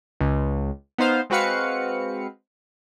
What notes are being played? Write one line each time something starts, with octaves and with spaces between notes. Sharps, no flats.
C#2
B3 D#4 C5 F5
G#3 C4 F#4 B4 F5 C#7